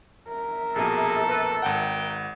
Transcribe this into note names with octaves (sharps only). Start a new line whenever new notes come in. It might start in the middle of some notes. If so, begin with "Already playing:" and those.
A#4 E5
A#1 F2 B2 G#4 A4
B4
G#1 F#5 G5